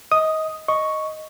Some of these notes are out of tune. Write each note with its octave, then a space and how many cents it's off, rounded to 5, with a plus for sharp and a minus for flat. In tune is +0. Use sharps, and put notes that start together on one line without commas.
D#5 +25 D#6 +0
D#5 +0 C#6 +0